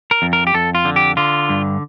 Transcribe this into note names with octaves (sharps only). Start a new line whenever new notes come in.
A#4
F2
A#4
G4
F2 A4
F4
D3
G4
D3 F4
G2